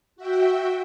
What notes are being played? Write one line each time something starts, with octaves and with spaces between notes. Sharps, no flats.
F#4 E5 G5